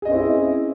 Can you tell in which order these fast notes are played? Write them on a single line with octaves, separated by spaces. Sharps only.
G#4 D#5 C#4 C4 E4